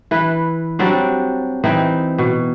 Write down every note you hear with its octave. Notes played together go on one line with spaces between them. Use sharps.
E3 B4
F#3 G3 C4 D4
E3 C4 D#4
B2